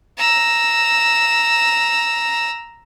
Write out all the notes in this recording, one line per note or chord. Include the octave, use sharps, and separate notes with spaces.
A#5 E6